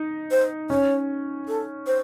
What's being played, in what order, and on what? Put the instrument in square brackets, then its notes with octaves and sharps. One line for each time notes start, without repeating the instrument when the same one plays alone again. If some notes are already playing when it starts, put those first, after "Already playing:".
Already playing: [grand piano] D#4
[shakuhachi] C5
[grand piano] C#4 [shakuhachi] C#5
[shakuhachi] A4
C5